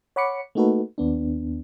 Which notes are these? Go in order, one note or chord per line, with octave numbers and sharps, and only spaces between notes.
C#5 F#5 B5 D6 C#7
A3 A#3 D#4 F#4 A4 B4
D#2 B3 D4